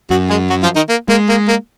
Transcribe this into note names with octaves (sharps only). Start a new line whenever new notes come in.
F#2 F#3 F#4
G#3 G#4
F#3 F#4
F3 F4
D#3 D#4
A#3
G#3 A#3
A#3
A#3